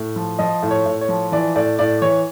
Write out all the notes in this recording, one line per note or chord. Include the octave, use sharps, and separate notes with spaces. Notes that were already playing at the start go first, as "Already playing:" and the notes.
Already playing: A2
F3
F3 D#5
A2
C#5
A2
C#5
F3
E3 D5
A2 D5
A2 D5
E3 C#5